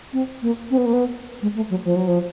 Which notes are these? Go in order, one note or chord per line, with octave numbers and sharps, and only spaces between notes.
C4
A#3
C4
B3
A#3
B3
G#3
A3
F#3
F3
F#3
F3